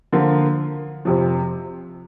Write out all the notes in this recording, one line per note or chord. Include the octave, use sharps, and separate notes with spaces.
D3 F3 A#3 F4 A#4
F2 C3 F3